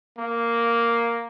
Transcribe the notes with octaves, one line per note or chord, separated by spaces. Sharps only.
A#3